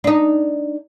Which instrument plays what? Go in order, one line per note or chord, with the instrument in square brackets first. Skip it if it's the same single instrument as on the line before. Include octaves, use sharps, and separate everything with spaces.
[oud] D4 D#4